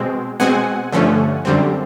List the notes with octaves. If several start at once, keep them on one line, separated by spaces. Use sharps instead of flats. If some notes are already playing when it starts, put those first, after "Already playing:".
Already playing: B2 G#3 C4
B2 G#3 C4 F#5 G#5
G2 D3 F3 A3 C#4
F#2 D3 G3 C4